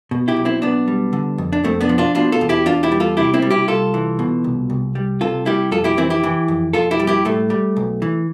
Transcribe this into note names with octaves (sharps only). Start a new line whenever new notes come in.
B2
E4 G4
B1
C4 E4
B1 B3 D4
G3
D3
F2
D4
F2 A3 C4
B3 D4
F3
D4 F4
B2 D4 F4
F4 A4
E2
E4 G4
E2 D4 F4
E4 G4
G3
F4 A4
C3 E4 G4
C4 E4
G3
E4 G4
C2 F4 A4
E3
B2
C2
C2
G3
C3 F4 A4
G3 E4 G4
F2 F4 A4
E4 G4
E3 C4 E4
E4 G4
E3
F2
F2 F4 A4
E4 G4
G3
E4 G4
A2 A3
G3
B1
E3